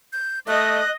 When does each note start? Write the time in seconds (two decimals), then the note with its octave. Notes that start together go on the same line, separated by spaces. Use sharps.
0.13 G6
0.48 A3 D#5 F#6